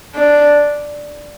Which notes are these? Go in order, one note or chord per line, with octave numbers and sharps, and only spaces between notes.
D4